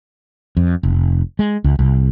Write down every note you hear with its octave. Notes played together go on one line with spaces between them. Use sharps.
F2
F1
G#3
C#2
C2